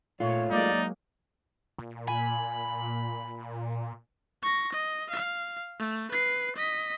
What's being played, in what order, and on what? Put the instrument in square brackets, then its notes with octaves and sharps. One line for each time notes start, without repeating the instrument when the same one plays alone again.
[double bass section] A#2 [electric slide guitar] A3 F4 [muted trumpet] C#5
[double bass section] F#3 G#3 A#3 [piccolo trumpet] D#4 [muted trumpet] D5
[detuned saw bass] A#2
[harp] G#5 [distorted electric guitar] B5
[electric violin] C#6 A#6
D#5
F5
A3
B4 C7
D#5 B6